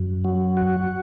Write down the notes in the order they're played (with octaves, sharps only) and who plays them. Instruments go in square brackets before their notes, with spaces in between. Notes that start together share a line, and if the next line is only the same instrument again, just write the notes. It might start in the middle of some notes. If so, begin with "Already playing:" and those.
Already playing: [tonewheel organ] F#2
F#3
F#4